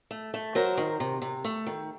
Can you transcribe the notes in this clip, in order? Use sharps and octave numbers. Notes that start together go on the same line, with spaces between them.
A3
A3
F#3 A#4 C5
D#3
C3
C3
A3
D#3